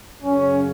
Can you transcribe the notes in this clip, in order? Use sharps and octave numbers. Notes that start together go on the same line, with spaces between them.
F#2 C#3 F#3 C#4